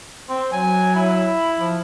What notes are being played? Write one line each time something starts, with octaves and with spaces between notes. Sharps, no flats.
C4 C5
F#3 G#5
E4
F3